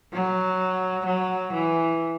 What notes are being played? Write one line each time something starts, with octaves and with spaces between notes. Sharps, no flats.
F#3
F#3
E3